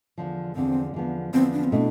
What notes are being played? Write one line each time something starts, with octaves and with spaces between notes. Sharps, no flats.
E2 D3 F3
E2 D3 F3 C4
E2 D3 F3 B3
E2 D3 F3 B3 C4
D4
C4
B2 A3 D4 E4